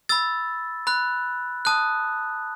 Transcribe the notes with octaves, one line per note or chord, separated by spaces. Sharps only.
B5 E6 A6
B5 F#6
A5 D#6 F#6